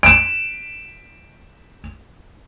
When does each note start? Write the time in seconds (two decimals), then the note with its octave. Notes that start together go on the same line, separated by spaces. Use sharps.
0.03 D7 E7